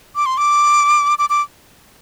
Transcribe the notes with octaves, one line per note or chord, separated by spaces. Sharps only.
D6
C6
D6
D6
D6